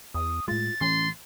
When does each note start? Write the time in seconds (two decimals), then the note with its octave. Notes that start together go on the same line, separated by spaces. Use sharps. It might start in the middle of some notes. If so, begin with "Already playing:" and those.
0.14 E2 D#6
0.48 A2 G#3 F4 A6
0.81 A1 E3 A3 C#4 C6